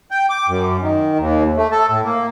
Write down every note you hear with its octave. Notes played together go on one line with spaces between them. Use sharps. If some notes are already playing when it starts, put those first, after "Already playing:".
G5
D6
F#2
D#3
D#2
A3
A4
A2
A#3